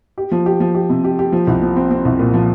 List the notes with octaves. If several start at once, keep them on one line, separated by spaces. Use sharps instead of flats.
G4
F3
G4
F3
G4
C3
G4
G4
F3
C2
F3
C4
C4
C2
A#2
F3